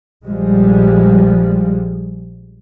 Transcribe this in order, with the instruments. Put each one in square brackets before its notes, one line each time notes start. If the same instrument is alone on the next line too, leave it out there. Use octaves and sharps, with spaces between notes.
[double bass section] A#1 A#2 F3 G3 G#3